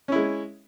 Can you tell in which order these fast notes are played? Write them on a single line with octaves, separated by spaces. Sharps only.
C#4 E4 G#3